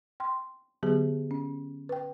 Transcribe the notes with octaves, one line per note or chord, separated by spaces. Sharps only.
G5 C6
D3 F#3 B3 G4 G#4
C#4
B4 G5